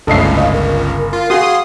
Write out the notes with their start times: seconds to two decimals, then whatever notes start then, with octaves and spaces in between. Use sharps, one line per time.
0.07 G1 C#2 A2 C#3 A4 D#5 E5 C7
0.38 D#5 F5
0.52 C#2 A#4
1.13 F4
1.30 F#4 G#4 F5 C6 D#6